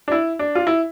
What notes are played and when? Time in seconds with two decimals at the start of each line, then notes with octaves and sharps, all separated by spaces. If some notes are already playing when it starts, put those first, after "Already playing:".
0.08 D4
0.12 E4
0.39 D4
0.55 F4
0.67 E4